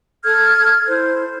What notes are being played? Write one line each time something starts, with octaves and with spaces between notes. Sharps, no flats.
A4 F6 G#6
E4 C5